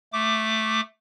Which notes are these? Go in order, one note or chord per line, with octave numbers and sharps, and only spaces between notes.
A3 D6